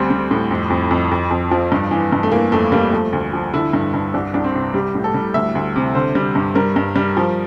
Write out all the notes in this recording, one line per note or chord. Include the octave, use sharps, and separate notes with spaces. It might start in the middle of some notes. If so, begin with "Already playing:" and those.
Already playing: D2 G3 C4
G3
A2
F2
F2
F2
F2
F2
F3
G2
E3
G2
A3
E3 A#3
F2 A3
G3 A#3
F3 A3
D2
F3
D3 E4
G2
G2
C2 D4
C2 D4
C4
C3
G3 G4
A2
A4
G3
D2 E5
D2
C3
D3 C5
G3
G2
G3 A#4
G2
G3
F3